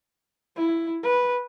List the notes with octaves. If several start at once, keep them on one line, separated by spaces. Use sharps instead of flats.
E4
B4